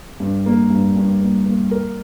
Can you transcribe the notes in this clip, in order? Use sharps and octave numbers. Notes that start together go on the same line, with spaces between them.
G2
A#3
G2
G2
A#3
A#3
A#4